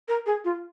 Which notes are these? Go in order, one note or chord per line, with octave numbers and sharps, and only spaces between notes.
A#4
G#4
F4